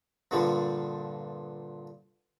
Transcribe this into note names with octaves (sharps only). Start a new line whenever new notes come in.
G2 A#2 D3 F3 G3